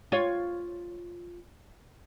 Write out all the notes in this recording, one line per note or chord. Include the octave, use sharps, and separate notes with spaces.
F4 C#5